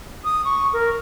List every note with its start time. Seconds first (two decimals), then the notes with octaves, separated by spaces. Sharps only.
0.24 D#6
0.45 C#6
0.73 A#4